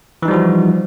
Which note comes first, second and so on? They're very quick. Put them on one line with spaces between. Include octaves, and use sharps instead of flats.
E3 D#4 G3 F3 F#4